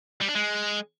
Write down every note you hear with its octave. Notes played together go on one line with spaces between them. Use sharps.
G3
D4
G#3